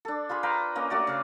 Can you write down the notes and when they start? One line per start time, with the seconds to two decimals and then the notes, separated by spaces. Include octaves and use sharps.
0.05 D4 A4
0.29 F4 G#4 B5 C6
0.43 B4 F5 G5 A#5
0.76 A#3 C#4 D#5
0.90 A3 F#4 D5
1.07 C#3 F5